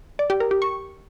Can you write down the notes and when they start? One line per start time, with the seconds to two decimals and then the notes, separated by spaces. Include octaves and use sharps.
0.19 D5
0.30 G4
0.40 A#4
0.51 G4
0.62 C#6